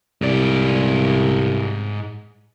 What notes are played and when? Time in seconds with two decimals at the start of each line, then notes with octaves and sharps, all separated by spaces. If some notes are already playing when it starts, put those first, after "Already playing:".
0.22 C2 G#2 D5